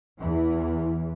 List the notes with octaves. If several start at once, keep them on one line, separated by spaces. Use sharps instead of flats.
E2 E3